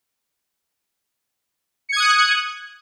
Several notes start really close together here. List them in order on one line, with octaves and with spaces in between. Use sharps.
C#7 G#6 D#6 F#6